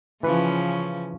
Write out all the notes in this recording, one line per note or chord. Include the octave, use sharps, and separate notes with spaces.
C#3 E3 F3 C#4 B4